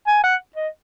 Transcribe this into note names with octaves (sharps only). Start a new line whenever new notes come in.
G#5
F#5
D#5